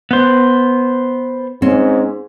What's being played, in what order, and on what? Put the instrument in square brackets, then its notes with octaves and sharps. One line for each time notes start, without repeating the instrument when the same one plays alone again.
[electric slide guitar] B3 C5
[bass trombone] G#2 [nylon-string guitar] C4 C#4